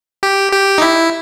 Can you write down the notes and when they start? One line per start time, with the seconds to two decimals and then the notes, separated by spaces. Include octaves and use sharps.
0.23 G4
0.52 G4
0.78 D#4
0.82 E4